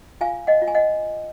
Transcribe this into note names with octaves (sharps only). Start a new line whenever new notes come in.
F4 F5 G#5
D#5 F#5
F4
G#5
D#5 F#5